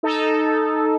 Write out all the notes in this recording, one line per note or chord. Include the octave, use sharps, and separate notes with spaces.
D#4 A4